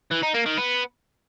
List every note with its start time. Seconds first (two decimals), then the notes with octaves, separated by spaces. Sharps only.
0.11 E3
0.22 D#4
0.34 A#3
0.46 D#3
0.57 B3